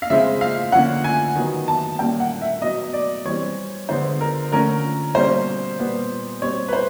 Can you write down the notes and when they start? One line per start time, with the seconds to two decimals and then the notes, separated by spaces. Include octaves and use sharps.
0.02 F5
0.10 C#3 F3 G#3 C4 E5
0.41 F5
0.72 D3 F3 A#3 C#4 F#5
1.04 G#5
1.35 D#3 F#3 B3
1.68 A5
1.99 A#2 G3 A#3 C#4 G5
2.20 F#5
2.41 E5
2.62 B2 F#3 B3 D#5
2.93 D5
3.25 E3 G3 C4 C#5
3.89 D3 F3 G#3 B3 C5
4.21 A#4
4.52 D3 F3 A3 C#4 A#4
5.15 B2 G3 A#3 C#4 C5
5.79 A#2 G3 B3
6.41 B2 G3 C4 C#5
6.68 B4
6.73 C5